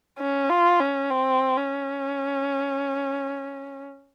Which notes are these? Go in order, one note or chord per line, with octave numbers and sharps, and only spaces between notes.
C#4
F4
C#4
C4
C#4